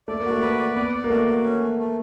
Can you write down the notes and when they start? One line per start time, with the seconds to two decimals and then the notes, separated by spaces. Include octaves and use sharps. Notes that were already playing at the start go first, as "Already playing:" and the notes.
0.08 A3 D5
0.20 A#3
0.25 F#4
0.31 A3
0.42 A3 B4
0.59 D5
0.76 B3 D5
0.93 D5
1.04 A#3
1.10 A3 F#4
1.27 F#4
1.44 C#4
1.61 A3
1.78 A3